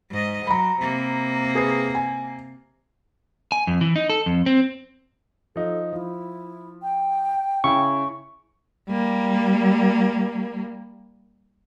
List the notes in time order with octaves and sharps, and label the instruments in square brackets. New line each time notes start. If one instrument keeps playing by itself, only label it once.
[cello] G#2 D#5
[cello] F#3 [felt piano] A#5 B5
[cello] C3 A#3
[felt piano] G#4 B4 C7
G#5
[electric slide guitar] G#5
F2
E3
D#4
A4
F2
C4
[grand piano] F3 D#4 [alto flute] A4
[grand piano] F3 [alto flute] E4
[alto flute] G5
[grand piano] C#3 E4 [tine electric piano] C#6
[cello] G3 A#3